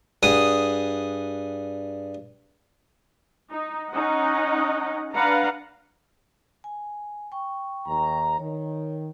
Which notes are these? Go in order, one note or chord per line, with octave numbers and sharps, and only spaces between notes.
G2 G#4 F#5 D#6
D#4
C#4 D#4 D#5 F#5
D4 B4 F5 F#5 A5 A#5
G#5
G5 C#6
D#2 A#5
D#3 C#5